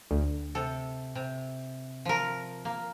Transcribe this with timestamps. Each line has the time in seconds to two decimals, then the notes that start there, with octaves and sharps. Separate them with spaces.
0.11 D2
0.55 C3 A4
1.15 C3
2.05 F3 A#4
2.65 A#3